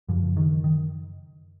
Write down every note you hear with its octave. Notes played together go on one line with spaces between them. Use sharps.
F#2 C#3 F3
D#3
D#3